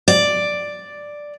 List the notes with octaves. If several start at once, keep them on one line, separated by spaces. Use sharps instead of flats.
D5